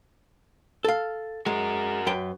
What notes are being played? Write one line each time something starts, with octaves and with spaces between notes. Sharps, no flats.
A4 F5
G#3 F#4 A#4
F#2 B4 G5